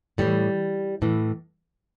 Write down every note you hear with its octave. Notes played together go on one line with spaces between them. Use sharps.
A2 E3 G3
A2 E3